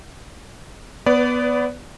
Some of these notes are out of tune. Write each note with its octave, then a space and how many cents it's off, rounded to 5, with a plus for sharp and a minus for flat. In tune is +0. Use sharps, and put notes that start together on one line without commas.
B3 +0 B4 +30 D5 -20